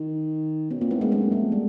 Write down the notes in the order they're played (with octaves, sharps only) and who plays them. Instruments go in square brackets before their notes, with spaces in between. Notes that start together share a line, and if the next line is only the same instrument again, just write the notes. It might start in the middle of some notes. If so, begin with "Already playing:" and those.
Already playing: [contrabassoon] D#3
[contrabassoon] B2 [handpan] B3 C#4
[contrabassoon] A#2 [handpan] A#3 C4
[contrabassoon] A2 [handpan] A3 B3
[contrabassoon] G#2 [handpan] G#3 A#3
[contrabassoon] G2 [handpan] G#3 A#3
[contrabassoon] F#2
[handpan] A3
[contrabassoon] F2
[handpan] G3